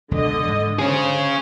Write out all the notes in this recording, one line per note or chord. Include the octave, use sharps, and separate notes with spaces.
E1 C#2 D3 F3 D#5
G#2 G#3
D3 C#4 G#4 C5 C#5